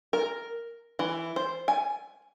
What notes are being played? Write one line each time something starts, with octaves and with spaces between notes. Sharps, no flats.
A#4
E3
C5
G#5